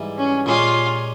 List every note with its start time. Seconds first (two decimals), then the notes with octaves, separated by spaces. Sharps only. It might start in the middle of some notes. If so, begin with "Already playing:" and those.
Already playing: G#2 E3 G3
0.18 C#4
0.46 A#2 G#3 C#4 F4 G4